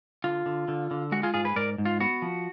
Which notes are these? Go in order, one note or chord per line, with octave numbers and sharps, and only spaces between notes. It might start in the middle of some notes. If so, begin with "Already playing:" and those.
D3 F4
D3
D3
D3
G#3 F#4
F4 G#4
G#2 F4 G#4
G#4 B4
G#2 A#4 D5
G#2
F4
B3 F#4
F3